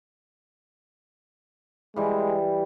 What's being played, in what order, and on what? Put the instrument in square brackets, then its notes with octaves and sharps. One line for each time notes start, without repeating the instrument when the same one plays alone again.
[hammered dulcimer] E3 G3 [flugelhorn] G#3